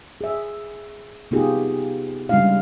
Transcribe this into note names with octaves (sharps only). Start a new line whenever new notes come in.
G#4 E5
C3 B3 D#4 F4 G4 G#4
C#3 G3 G#3 D4 E4 F5